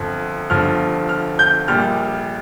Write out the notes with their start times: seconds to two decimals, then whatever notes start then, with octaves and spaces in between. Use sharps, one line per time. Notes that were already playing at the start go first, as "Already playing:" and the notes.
Already playing: G1 F2 F3
0.50 G1 G2 F3 F6
1.09 F6
1.39 G6
1.68 A#1 A#2 G3 F6